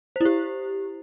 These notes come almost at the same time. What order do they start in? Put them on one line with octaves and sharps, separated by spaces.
C5 E4 G4